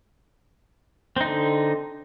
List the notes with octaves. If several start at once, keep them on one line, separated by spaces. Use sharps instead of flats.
D3 C4 D#4